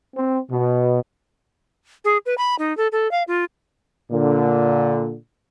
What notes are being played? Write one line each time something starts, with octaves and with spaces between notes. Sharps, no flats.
C4
B2
G#4
B4
B5
D#4
A4
A4
F5
F4
A#2 D3